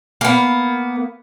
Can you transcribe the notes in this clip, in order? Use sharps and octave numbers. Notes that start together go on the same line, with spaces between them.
A#3 B3